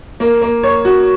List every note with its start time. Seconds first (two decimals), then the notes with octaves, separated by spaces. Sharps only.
0.20 A#3
0.42 A#3
0.63 C#5
0.85 F#4